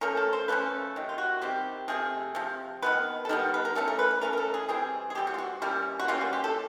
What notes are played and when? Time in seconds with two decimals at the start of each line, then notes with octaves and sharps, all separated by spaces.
0.01 F3 A3 C#4 A#4
0.17 A4
0.33 C5
0.48 F3 A3 C#4 B4
0.96 C3 D#3
1.09 F4
1.18 F#4
1.41 C3 D#3 G3 C4 G4
1.88 C3 F3 A3 G#4
2.35 C3 F3
2.82 D#3 G3 B3 B4
3.25 A4
3.29 D#3 G3 B3 A#4
3.54 B4
3.65 A#4
3.75 E3 A3 C#4 A4
3.88 A#4
3.99 B4
4.11 B4
4.21 E3 A3 C#4 A#4
4.33 A#4
4.37 A4
4.54 G#4
4.69 E3 G3 C4 G#4
5.10 G#4
5.15 E3 G3 C4 G4
5.27 F#4
5.34 F4
5.38 F#4
5.62 E3 G3 A#3 C#4 E4
5.99 F#4
6.08 E3 G3 A#3 C#4 F4
6.21 F#4
6.33 G4
6.44 A4